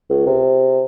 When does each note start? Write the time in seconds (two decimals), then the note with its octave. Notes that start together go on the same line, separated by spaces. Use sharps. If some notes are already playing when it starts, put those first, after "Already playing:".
0.09 C#2
0.26 C3